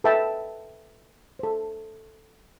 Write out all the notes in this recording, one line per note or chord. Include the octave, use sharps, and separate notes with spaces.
A4 B4 D#5 E5 G5 A5
A4 C5